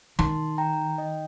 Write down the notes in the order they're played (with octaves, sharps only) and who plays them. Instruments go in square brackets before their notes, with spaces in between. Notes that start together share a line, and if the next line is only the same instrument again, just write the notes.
[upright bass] D#3 [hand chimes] A5 C6
[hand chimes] G5 A#5
D#5 G5